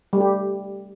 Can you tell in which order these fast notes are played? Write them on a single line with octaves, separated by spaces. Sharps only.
G3 A3 G4